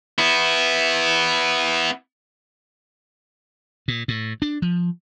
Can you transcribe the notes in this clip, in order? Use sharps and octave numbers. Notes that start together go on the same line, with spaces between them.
B3 E4
A#2
A2
D4
F3